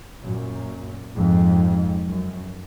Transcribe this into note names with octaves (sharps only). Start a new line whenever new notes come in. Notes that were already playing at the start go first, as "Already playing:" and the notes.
F#2 A#2
F2 G#2
F#2